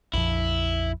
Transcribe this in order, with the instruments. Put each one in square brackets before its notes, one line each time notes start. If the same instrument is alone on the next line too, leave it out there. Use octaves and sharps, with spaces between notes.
[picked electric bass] A#1 F2 F3 [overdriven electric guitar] E4